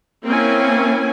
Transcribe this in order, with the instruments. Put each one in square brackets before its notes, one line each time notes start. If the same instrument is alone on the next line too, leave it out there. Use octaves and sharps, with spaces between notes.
[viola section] A#3 C4 C#4 E4 G#5